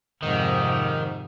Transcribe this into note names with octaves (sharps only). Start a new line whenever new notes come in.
F2 G#2 C3 D#3